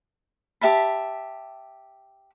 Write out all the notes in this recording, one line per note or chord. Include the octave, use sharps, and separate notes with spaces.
G4 E5 A5 B5